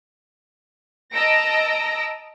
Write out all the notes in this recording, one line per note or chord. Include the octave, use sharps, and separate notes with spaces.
D#5 A5 A#5 E6 A#6 D7